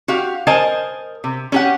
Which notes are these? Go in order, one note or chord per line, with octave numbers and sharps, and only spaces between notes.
F#4 G4 F5
A#4 C5 D#5 G#5 A5
C3
C#4 G4 F#5